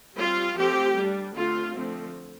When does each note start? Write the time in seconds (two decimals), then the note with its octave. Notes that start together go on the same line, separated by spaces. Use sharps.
0.17 G3 C4 F4
0.57 F3 A3 C4 G4
0.96 G3 D4
1.35 D3 A3 C4 F4
1.75 D3 F3 A3 C4